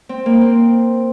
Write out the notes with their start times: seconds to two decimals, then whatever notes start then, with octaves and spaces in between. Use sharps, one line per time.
0.09 C4
0.26 A#3
0.41 C4